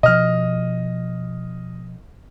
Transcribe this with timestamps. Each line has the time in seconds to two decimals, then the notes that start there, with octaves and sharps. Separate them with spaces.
0.03 B2 F3 D#5 F6